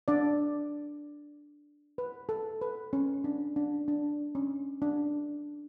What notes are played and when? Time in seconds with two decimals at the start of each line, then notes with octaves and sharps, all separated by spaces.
0.08 D4 D5
1.98 B4
2.29 A4
2.61 B4
2.93 C#4
3.24 D4
3.56 D4
3.88 D4
4.35 C#4
4.82 D4